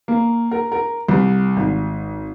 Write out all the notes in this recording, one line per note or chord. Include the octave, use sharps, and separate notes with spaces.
A#3
A#4
A#4
C2
G#1